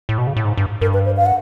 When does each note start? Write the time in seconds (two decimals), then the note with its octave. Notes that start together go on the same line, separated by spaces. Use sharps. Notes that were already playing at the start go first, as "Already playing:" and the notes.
0.09 A2
0.18 B2
0.27 C#3
0.36 A2
0.45 G#2
0.57 G2
0.81 G2 A#4
0.94 B4
1.06 C5
1.17 F5
1.26 F#5